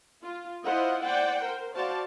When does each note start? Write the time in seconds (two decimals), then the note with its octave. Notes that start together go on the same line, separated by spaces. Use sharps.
0.23 F4
0.64 E4 F4 C5 D#5 F#5
1.03 C5 D5 F#5 G5
1.41 A#4 C5
1.75 F#4 C5 D5 F5 A5